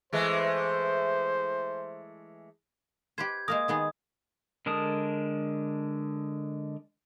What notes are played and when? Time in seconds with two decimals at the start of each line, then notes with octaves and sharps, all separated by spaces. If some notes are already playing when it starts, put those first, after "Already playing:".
0.13 E3 G#3 A3 C5
3.18 G4 B4 C5 G#6
3.48 G#3 A#3 A#4 D#6
3.68 D#3 B3 G#4
4.66 D3 G#3 A#4 A5 D#6